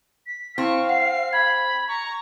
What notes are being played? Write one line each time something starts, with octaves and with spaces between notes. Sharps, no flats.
B6
C4 E4 F5 C#6
F#5 C7
B5 G#6
A#5 C#6